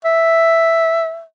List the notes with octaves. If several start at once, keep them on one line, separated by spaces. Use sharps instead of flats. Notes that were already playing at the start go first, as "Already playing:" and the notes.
E5